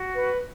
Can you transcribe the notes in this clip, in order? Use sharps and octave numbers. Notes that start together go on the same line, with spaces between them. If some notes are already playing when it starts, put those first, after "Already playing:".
Already playing: F#4
B4